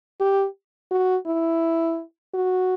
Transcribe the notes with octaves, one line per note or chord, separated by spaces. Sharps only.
G4
F#4
E4
F#4